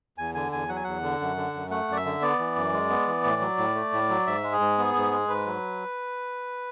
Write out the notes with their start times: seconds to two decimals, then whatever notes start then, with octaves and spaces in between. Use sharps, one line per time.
0.18 E2 G#5
0.35 D3 G#5
0.52 E2 G#5
0.68 F#3 F#5
0.76 G#5
0.84 E2 F#5
1.03 D3
1.20 F#2
1.37 D3
1.53 F#2
1.70 A3 F#5
1.88 F#2 D5
1.96 E5
2.05 D3
2.22 B3 D5
2.39 E3
2.56 F#2
2.73 G#3
2.90 B3
3.07 E3
3.24 A2
3.41 F#3
3.58 A2
3.75 A3
3.93 A2
4.09 F#3
4.27 G#2 E5
4.43 G#3
4.52 G#4
4.60 G#2
4.78 B3
4.95 G#2
5.11 G#3
5.28 G#2 B4
5.46 F#3